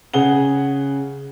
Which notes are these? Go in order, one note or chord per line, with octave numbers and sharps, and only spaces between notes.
C#3 G#4 F#5 G7